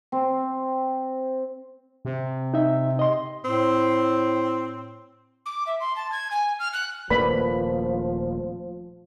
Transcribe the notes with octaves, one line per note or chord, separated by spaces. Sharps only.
C4
C3
D#4 E5
D#5 C6
A2 C4
D6
E5
C6
A5
G#6
G#5
F6
F#6
D#1 F3 A3 A#3 B4 D5 B5